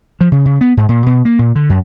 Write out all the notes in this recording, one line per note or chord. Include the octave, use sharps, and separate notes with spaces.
F3
C#3
C#3
B3
G#2
A#2
B2
A#3
A#2
D3
F#2